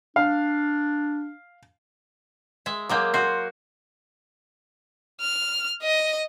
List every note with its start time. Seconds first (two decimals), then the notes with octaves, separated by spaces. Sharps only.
0.16 D4 F5
2.66 G#3 E5
2.89 F#3 G#3 A#3 D6 G6
3.14 F#4 C6 G6 C7
5.22 F6
5.82 D#5